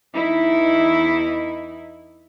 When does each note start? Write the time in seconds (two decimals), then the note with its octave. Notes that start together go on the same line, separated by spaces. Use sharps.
0.15 E2 D#4 E4